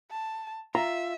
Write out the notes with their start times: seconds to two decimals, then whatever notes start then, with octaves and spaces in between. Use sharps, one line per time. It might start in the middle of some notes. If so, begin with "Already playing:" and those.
0.11 A5
0.75 F4 E5 A#5